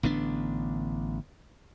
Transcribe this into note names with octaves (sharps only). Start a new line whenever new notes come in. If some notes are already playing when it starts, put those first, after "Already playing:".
A1 D3 B3 D4